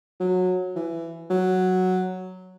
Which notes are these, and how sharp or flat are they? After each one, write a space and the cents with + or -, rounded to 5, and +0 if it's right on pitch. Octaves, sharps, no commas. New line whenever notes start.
F#3 -20
E3 +15
F#3 +0